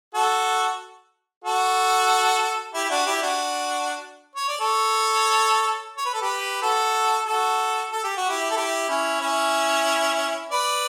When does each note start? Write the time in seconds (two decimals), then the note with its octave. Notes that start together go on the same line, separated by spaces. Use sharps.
0.14 F#4 A4
1.44 F#4 A4
2.74 E4 G4
2.85 E4
2.90 D4 F#4
3.06 E4 G4
3.22 D4 F#4
4.36 C#5
4.48 D5
4.60 A4 C#5
5.97 C#5
6.06 B4
6.14 A4
6.22 G4 B4
6.62 F#4 A4
7.27 F#4 A4
7.92 A4
8.04 G4
8.17 F#4
8.29 E4 G4
8.51 A4
8.57 E4 G4
8.89 C#4 E4
9.21 C#4 E4
10.51 B4 D5